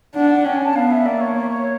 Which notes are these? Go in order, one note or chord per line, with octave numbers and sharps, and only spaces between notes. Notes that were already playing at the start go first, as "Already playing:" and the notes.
D4 F#5
F#5
C#4 G5
G#5
A5
B3 F5
E5
A#3 D5
C#5
C#5
C#5